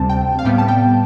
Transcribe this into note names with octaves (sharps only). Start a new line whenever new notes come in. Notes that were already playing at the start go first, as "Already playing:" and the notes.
Already playing: D2 C3 G3 C4 A5
G5
F5
A2 G3 B3 G5
A5
G5